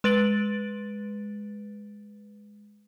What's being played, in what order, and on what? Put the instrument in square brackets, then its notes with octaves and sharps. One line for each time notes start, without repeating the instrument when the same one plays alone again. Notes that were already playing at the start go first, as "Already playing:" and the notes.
[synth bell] G#3 B4 A6 D7 F#7